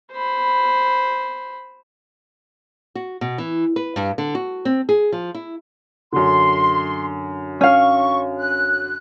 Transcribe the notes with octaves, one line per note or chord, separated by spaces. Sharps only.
C5 B5
F#4
B2
E3
B4
G2
D3
F#4
C4
G#4
F3
E4
F#2 D3 C6
C#4 F5 C#6
F#6